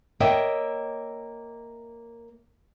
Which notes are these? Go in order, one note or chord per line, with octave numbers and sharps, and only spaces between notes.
A#3 C#5 D#5 E5 G5